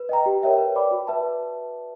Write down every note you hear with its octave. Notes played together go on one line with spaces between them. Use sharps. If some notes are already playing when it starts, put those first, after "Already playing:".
Already playing: B4
D#5 G5 A#5
G4
A#4 C#5 E5 G5
B4
D5 G5 B5 D6
F#4
B4 E5 A5